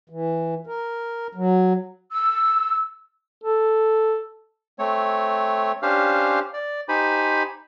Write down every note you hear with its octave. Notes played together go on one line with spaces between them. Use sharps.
E3
A#4
F#3
E6
A4
A3 C4 C#5
C#4 D4 G4 C5 F5 F6
D5
D#4 G4 C5 G#5 B5